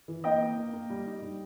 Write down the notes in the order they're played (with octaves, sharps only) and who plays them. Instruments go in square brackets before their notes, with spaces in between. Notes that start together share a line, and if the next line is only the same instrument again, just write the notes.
[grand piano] E3
[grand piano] A#3 [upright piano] D#5 G5
[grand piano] A#3
A#3
A#3
G3
D#4
G3